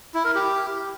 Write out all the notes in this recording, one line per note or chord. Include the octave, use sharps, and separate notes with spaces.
E4
A#4
G4